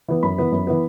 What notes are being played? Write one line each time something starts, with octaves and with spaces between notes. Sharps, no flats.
E3 B3
F#2 B5
E3 B3
F#2
E3 B3